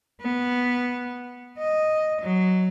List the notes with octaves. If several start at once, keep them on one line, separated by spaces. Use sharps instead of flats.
B3
D#5
F#3